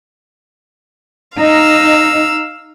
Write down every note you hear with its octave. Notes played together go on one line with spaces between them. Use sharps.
D#4 F5 E6